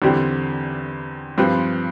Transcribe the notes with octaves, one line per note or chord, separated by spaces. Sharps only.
E2 D3 G3 C4 G4
G2 F3 C4 G4 B4